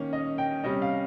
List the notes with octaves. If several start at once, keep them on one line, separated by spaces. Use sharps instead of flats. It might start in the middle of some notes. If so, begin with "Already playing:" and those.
Already playing: D#3 A#3 C#4
D#5
G5
C3 G3 C#4 D#5
F5